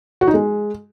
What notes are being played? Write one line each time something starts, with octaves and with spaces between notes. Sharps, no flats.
F#4
D#4
G#3